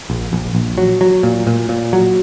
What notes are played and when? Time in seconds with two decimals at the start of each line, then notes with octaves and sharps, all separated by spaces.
0.10 A#1
0.33 A#1
0.55 A#1
0.78 F#3
1.01 F#3
1.23 A#2
1.47 A#2
1.69 A#2
1.93 F#3